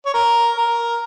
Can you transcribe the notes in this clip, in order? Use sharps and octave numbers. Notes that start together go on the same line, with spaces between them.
C#5
A#4
A#4